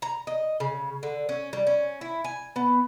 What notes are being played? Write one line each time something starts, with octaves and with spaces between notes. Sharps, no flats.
A#5
D#5
C#3
D3
C#4
G3
C#4
E4
G#5
B3